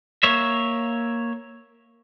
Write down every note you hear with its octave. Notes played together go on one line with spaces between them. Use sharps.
A#3 C#5 E5